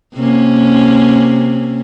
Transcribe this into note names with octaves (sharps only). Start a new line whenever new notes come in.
C3 A#3 C#4